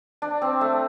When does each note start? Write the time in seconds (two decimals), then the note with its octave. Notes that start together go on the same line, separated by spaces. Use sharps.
0.22 D4
0.42 C4
0.61 A3